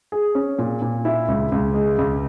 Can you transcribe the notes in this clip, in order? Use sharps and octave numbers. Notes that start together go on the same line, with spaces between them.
G#4
C#4
A#2
A#2
E4
C#2
C#2
G#3
C#2